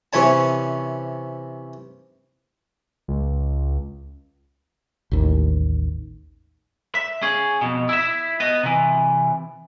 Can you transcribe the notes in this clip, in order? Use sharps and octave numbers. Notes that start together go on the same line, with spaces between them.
C3 E3 C#4 C#5 A5
C#2
A1 D#2
E5
C#4 G#4
F2 B2
E4 E5
B3 D#5
C3 E3